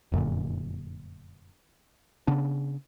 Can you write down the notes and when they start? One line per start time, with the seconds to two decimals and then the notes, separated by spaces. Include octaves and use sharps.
0.12 F1 F#2 A#2 D3
2.27 C#3 B3 D4